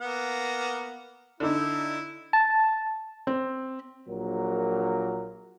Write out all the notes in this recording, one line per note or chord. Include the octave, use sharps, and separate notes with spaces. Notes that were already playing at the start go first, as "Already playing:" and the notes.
A#3 B3 F#5
D3 D#4 E4
A5
C4
A#1 A#2 F#3 A#4